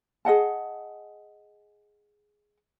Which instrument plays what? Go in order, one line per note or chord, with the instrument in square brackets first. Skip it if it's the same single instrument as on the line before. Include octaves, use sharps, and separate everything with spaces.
[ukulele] G#4 D#5 F#5 A5